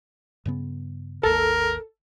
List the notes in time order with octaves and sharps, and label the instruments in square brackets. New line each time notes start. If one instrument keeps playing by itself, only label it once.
[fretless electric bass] G2 C#3 B3
[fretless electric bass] G#1 D#2 [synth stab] A4 [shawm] A#4